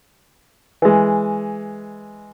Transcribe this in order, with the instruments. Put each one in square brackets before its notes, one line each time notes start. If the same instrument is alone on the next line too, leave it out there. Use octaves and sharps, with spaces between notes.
[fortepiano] E3 G#3